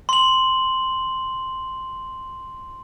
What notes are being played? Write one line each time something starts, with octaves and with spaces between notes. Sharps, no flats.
C6 F#7